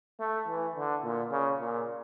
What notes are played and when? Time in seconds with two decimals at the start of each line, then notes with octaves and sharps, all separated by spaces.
0.20 A3
0.48 E3
0.76 D3
1.04 A#2
1.32 C#3
1.60 A#2